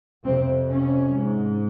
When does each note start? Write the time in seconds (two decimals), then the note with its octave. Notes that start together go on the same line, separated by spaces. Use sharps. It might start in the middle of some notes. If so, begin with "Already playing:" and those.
0.24 F2 C3 C4
0.69 C#4
1.15 G#2